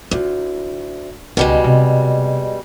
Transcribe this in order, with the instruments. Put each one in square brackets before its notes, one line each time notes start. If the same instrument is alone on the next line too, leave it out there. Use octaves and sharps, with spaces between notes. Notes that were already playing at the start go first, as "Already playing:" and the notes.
[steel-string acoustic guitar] D2 [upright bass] E4 F4
[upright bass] C#2 D#3 [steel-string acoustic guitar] B2 G3 G#3
[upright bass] C3